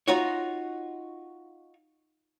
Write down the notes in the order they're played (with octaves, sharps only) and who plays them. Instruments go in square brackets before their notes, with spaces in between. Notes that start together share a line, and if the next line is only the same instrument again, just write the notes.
[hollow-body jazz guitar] D#4 F4 F#4 C#5